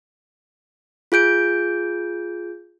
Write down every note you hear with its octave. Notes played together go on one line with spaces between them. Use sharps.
F4 G#4 G6 D7